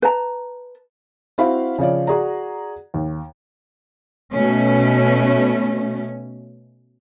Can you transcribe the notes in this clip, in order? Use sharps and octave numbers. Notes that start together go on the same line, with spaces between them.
B4 A5 A#5
C4 E4 F#4 F5 B5
C#3 F3 C#5 D5
F#4 G#4 D5 A#5
D#2
B2 A3 C#4